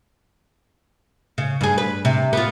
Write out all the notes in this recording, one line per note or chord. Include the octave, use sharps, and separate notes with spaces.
C#3
G2 G#4
B4
C3
B3 F4